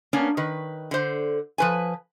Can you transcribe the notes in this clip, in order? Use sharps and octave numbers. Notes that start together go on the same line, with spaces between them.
A#3 B3 C#4 D4
D#3 B4
D3 C5
F3 B4 G#5